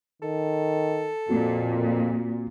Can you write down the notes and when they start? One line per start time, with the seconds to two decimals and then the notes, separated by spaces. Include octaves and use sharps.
0.22 D#3 A4
1.29 F2 A#2 A#3 C4 F#4